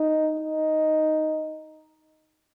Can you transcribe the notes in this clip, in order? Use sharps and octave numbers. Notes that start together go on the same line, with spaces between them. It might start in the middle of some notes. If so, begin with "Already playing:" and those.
Already playing: D#4
D#4